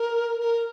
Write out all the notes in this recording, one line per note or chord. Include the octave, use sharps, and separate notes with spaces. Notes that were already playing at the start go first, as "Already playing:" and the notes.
Already playing: A#4
A#4